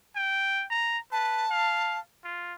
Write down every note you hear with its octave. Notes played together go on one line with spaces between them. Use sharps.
G5
A#5
B4 A5
F5
F4